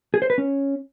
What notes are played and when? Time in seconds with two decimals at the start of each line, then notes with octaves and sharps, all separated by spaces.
0.14 G#4
0.22 C5
0.30 B4
0.38 C#4